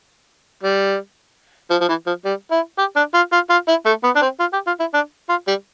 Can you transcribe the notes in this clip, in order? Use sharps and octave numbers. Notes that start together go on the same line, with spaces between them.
G3
F3
F3
E3
F3
G3
E4
G4
D4
F4
F4
F4
E4
A3
B3
D4
C4
F4
G4
F4
E4
D4
F4
G3